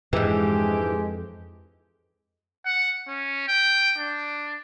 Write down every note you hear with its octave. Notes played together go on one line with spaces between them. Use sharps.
F2 G#2 E3 G#3 D4 G4
F#5
C#4
G5
D4